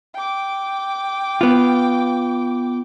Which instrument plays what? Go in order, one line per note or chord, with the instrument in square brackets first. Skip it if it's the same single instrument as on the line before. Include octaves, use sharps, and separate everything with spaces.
[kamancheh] G5 D6
[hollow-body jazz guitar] B3 F4